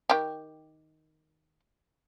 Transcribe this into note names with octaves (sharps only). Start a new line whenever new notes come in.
D#3 G4